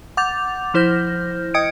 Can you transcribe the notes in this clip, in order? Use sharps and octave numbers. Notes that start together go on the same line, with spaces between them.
F#5 D6 G6 A6 F7
F3 E4 C5 F6 G6 A#6
D#5 G5 D#6 G#6 C#7 D7